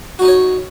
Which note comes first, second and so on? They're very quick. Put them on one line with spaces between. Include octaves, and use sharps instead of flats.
F#4 D#4 D#5 C#5